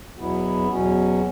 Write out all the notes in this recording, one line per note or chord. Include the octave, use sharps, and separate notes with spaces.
E2 B2 F#3 B3 E4
E2 B2 F#3 C#4